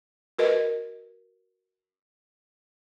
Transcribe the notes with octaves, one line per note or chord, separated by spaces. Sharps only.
F#4 A#4 B4 D#5